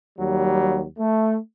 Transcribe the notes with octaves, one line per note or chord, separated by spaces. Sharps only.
D#2 F#3 G3
A3